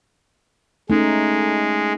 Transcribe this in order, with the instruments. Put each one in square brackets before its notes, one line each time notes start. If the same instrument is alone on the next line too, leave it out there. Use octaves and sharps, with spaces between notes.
[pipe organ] G#3 [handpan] A3 C#4 D#4